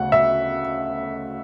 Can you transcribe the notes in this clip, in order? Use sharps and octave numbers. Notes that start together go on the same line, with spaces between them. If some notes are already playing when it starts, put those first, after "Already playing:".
Already playing: D2 C#3 A3 F#5
E5